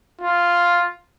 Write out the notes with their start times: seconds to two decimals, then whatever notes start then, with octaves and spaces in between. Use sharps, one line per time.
0.21 F4